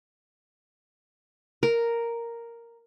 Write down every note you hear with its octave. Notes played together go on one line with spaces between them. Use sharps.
A#4